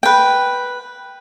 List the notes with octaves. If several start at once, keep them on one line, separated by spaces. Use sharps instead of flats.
B4 G5